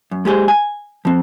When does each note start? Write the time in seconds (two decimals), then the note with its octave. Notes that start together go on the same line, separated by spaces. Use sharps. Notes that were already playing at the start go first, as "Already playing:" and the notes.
0.11 F#2
0.25 G#3 G4 G#4 C5
0.48 G#5
1.05 F3 C4